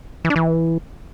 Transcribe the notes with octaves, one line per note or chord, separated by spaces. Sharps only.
E3
D4
E3